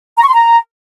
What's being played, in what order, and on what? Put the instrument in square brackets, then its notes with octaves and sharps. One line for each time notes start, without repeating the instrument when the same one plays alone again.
[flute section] A#5
C#6
C6
A#5